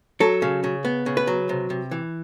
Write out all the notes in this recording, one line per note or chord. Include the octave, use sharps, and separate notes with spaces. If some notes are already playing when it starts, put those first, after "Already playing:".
F#3 A4
C#3
C#3
B3
C#3
B4
F#3
C3
C3
E3